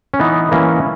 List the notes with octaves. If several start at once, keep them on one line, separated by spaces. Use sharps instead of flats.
C#4
E3 B3 D#4
E3 A#3 C#4